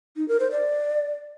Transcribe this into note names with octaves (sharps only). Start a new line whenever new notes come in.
D#4
A#4
C5
D5